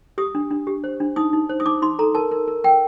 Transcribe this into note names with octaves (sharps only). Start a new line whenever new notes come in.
G4 D#6
D4
D4
G4
C5
D4
D#4 D#6
D#4
C5
D#6
D#4 D6
D#4 C6
A4 A#5
A#4 A5
A#4
A#4
A#4 G5